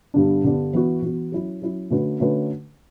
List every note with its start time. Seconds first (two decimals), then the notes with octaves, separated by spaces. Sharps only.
0.14 G2 D3 G3 B3 D4
0.44 G2 D3 G3 B3 D4
0.73 E3 B3 F#4
1.02 E3 B3 F#4
1.32 F#3 C#4 E4
1.62 F#3 C#4 E4
1.90 D3 A3 C#4 F#4 B4
2.20 D3 A3 C#4 F#4 B4